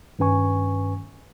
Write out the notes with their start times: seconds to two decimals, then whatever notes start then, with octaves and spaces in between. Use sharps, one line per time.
0.19 G2 D#3 C#4 B4 G#5 C#6